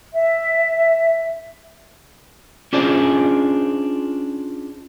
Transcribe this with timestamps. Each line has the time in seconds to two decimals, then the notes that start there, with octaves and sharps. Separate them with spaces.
0.13 E5
2.73 C#4 D4 F4 G#4 C5 D5